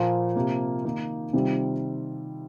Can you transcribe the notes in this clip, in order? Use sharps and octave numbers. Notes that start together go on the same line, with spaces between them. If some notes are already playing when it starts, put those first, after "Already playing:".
Already playing: A#2 F3 A#3 F4 C5
C3 F3 A#3 G4
D#3 A#3 D#4
C3 D#3 G3 C4 F4